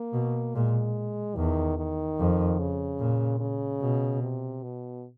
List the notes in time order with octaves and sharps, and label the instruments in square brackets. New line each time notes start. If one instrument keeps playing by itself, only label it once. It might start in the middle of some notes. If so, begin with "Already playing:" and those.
Already playing: [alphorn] A#3
[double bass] B2
[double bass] A#2 [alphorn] G#3
[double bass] E2 [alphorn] D#3
[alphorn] D#3
[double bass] F2
[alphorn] C#3
[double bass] A#2
[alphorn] C#3
[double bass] B2
[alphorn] C3
B2